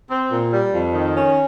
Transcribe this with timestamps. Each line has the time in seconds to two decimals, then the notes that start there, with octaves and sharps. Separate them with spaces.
0.11 C4
0.31 A#2
0.52 G3
0.73 F2
0.94 D#3
1.15 C#4